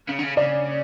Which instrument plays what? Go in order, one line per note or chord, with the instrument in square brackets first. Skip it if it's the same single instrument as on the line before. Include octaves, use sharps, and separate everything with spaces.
[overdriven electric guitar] C#3
D3
C#3
[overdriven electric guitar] C#3 [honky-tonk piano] D5